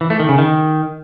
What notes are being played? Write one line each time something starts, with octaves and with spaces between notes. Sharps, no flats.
E3
A3
D#3
C#3
D#3